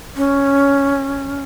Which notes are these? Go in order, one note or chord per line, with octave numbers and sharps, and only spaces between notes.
C#4